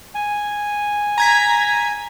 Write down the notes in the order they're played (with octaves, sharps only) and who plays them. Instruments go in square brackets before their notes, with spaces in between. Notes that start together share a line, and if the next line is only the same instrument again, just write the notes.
[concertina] G#5
[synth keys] A#5 G#6 B6